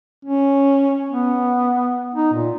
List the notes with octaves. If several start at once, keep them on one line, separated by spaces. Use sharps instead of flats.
C#4
B3
D#4
A#2